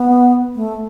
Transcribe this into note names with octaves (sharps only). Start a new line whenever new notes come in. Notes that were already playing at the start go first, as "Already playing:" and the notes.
Already playing: B3
A3